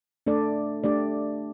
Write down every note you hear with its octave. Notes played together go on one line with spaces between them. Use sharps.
A3 D4 A4 D5
A3 D4 G4 D5